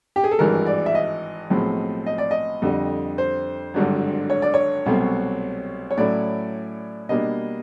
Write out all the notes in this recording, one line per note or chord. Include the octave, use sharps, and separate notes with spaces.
G4
G#4
A4
G#1 G2 E3 G#3 A#4
D5
E5
D#5
B1 A2 F3 G#3 C4
D#5
D5
D#5
F2 D3 G3
C5
G#1 G2 D3 F#3
C#5
D5
C#5
C2 B2 F#3 A3 C4
C#5
A2 F#3 A3 C#4 E4 D5
B2 G3 A#3 D4 D#5